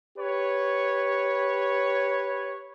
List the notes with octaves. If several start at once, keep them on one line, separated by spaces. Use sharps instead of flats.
G4 B4 C#5